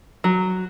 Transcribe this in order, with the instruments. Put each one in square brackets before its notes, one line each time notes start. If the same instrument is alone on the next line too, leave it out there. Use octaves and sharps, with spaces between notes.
[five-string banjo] F#3